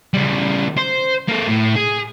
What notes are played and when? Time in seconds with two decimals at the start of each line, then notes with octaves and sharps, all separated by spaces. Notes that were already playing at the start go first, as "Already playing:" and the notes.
0.14 C#3 G3
0.77 C5
1.29 A#3 A4
1.48 A2
1.76 G#4